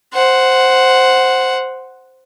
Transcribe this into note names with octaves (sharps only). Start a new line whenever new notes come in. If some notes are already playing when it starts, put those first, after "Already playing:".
C5 F#5